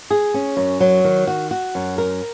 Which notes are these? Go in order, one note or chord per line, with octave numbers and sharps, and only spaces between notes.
G#4
C#4
F#2
F#3
D#3
F#4
F#4
F#2
A#4